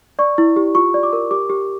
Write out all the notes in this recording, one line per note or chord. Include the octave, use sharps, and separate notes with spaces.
D5 C#6
E4
G4
F4 C#6
D5
D6
A#4
G4 D6
G4